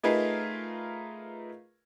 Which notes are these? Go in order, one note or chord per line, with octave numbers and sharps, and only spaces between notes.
A3 D#4 F4 G#4 A#4 B4